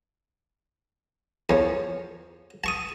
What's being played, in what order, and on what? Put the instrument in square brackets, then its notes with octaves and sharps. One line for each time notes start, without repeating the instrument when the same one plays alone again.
[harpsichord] E2 [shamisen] F3 C#5
[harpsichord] A5 C#6 D#6